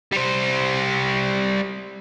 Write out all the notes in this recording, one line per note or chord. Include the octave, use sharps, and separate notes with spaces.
G3 C5